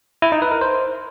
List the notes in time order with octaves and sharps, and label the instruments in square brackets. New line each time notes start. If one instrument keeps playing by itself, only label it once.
[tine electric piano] E4
D#4
B4
A#4
C5